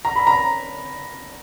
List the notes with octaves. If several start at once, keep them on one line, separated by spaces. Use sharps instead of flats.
A#5
B5
A#5